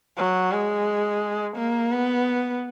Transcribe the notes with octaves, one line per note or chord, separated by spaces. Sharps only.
F#3
G#3
A#3
B3